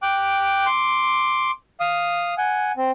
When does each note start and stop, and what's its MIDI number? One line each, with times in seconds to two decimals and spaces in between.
0.02 0.66 79
0.02 0.66 86
0.02 0.66 90
0.66 1.51 84
0.66 1.51 86
1.80 2.34 77
1.80 2.34 87
2.38 2.72 78
2.38 2.72 80
2.77 2.91 60